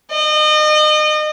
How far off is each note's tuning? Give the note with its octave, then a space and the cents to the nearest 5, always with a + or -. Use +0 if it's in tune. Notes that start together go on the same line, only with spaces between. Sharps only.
D#5 -35